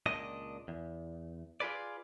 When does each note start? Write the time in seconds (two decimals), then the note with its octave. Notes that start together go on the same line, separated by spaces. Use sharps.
0.06 C#2 A#2 D4 D#5
0.68 E2
1.60 F4 G#4 B4 D5